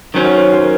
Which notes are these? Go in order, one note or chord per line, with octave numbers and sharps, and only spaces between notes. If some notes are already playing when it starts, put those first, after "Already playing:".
F#2 D#3 F#3 C#4 C5
C#5
C5
C5
A#4